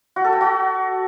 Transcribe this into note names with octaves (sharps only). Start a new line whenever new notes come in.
F#4
A4
G5
F#4